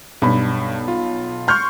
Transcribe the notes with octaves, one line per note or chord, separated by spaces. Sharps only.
B1 G2 B5
F4
C6 C#6 F6 G6